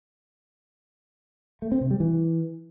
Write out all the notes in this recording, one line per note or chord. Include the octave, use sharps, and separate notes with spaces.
A3
C4
C3
G3
E3